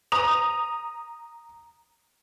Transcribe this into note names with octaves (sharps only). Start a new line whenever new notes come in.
A#5 D#6 F7